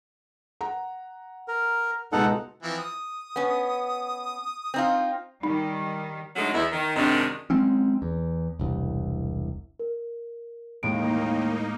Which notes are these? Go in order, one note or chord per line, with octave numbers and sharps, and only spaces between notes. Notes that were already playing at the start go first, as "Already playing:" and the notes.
F#5 A#5
A#4
C#2 B2 G#3 D#4 A4 F#5
E3 F3 C4
D#6
B3 C#4
C4 D#4 F4
D#3 G3 D#4
D3 F#3 G#3 A3 C#4 D#4
E2 E4
D#3
F#2 C3 D#3 G#3 D4
F#3 G#3 C4 C#4
E2
E1 C2
A#4
D#2 A2 G#3 A#3 D#4 D7